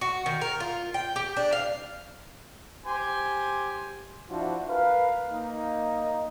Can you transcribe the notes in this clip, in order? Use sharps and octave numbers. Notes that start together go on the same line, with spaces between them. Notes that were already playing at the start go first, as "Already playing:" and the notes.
F#4
D#3
A#4
F4
G5
G4
D4
F5
G4 C5 G#5
F3 D4 E4 F#4 C5
A#4 B4 F5
A#3 D#4